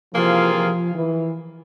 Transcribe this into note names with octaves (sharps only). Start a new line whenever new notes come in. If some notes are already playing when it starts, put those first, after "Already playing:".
C3 E3 F3 A#3 F4 G#4
F3
E3